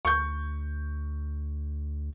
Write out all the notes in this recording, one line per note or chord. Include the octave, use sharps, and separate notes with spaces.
D2 C#6 G6